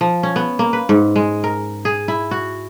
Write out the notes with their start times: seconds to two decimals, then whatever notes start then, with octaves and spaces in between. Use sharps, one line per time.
0.01 F3
0.23 C#4
0.36 B3
0.59 A#3
0.73 B4
0.89 G#2
1.16 G#3
1.44 A#4
1.85 G#4
2.08 E4
2.31 F#4